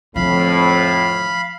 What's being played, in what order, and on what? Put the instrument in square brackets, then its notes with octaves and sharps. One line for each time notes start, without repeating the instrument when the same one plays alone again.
[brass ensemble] F2 A2 [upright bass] D3 F3 [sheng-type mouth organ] F5 B5